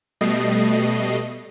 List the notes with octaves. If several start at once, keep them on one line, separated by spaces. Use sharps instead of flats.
B2 G3 A3 D#5 C7